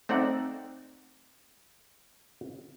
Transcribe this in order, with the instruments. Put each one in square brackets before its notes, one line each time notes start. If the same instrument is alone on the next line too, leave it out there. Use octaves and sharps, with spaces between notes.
[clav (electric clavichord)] A3 C4 D#4 D5 F#5